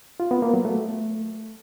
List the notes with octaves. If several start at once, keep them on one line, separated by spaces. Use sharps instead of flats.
F4
B3
A#3
F#3
A3